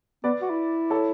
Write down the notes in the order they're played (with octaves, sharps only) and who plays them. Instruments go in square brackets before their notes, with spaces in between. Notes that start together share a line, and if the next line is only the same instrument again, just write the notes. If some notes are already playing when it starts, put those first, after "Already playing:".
[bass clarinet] B3 [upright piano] B4 D5
[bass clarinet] F#4
E4
[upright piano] A4 C#5